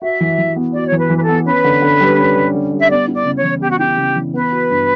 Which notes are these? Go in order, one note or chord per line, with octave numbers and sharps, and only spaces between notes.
F#4 E5
E3
E3
B3
F#4 D5
E3 C#5
B4
E3
B4
A4
B3
C#4 B4
D3
D3
G3
C#4
D3
D3
G3
E5
B3 D5
E4
D5
C#3
C#5
E3
B3 G4
F#4
E4 G4
C#3
E3
B3 B4
F#4
G2